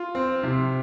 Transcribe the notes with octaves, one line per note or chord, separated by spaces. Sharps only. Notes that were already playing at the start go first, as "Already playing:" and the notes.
Already playing: F4
C4
C3